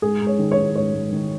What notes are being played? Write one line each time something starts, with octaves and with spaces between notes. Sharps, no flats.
G#2 G#4
G#2
C#5
D#3
C#5
D#3
G#2 C#5
G#2
D#3